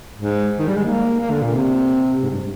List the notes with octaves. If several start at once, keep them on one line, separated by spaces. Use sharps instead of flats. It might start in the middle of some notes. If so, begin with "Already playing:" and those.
G#2
D#3
G3
G#3
A#3
A#3
D3
A#2
C3
G#2
G2